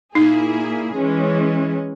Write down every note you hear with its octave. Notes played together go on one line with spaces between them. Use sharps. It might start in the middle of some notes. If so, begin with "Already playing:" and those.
A#2 A#3 D#4 E4 G#4
E3 G#3 C#4